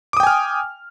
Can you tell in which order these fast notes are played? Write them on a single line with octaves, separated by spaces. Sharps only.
D6 D#6 G5 G#5 F6